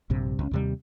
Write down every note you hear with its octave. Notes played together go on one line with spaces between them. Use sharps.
A#1 G2 C3
C#2 F#3 C#4
D#2 C3 G3